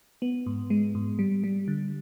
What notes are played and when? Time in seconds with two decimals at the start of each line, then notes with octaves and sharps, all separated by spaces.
0.22 B3
0.46 G#2
0.70 G#3
0.95 G#2
1.19 G3
1.44 G3
1.68 D3